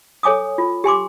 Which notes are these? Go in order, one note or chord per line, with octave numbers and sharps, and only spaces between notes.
A4 C#5 G#5 D6 D#6
F4
G4 G#5 C6 D6